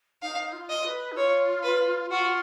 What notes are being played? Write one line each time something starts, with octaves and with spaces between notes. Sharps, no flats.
D#4 F5
F4
D#5
B4
D#4
F4 C#5
B4
F4 F#4